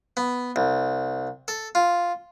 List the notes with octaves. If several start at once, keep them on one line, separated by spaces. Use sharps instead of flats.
B3
C2
A4
F4